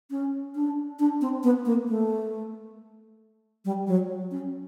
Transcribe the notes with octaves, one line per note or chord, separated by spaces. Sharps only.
C#4
D4
D4
C4
B3
A#3
A3
G3
F#3
C#4